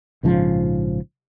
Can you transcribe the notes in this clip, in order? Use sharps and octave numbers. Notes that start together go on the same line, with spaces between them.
A#1 G#2 C#3 F3